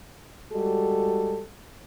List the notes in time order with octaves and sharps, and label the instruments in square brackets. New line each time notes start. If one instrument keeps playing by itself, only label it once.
[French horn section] G3 G#3 F#4 A4